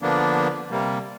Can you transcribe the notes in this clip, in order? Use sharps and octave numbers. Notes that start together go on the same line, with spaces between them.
D3 F3 A#3 B3 D4
C3 G3 A#3